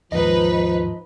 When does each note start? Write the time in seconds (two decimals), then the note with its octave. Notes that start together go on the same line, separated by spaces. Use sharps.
0.12 D#2 G#2 F3 D#4 B4 D#5